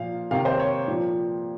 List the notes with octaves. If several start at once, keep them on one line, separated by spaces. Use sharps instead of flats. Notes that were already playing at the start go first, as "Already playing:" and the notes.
Already playing: A#2 F3 F5
C3 D#3 F5
C5
C#5
A#2 F3